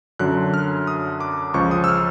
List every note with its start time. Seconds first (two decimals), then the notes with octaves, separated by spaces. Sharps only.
0.19 F#2 D3 F#3 F#6
0.54 F6
0.87 D#6
1.20 D6
1.54 C#2 C#3 F3 C#6
1.71 D#6
1.84 E6
1.88 F6